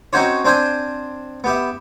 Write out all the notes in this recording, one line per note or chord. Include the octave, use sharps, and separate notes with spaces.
C4 C#4 D#4 F#4 C5 C#5
C4 D4 C5 G5 G#5
B3 G4 E5